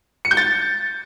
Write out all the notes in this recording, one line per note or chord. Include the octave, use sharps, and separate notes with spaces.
C#7
G6
A6